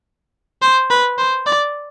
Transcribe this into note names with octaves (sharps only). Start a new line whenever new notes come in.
C5
B4
C5
D5